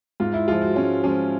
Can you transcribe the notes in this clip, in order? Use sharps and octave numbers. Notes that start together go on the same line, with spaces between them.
G#2 F4
E4
F3 G#3 F4
F#4
G#2 C#4
F3 G#3 C#4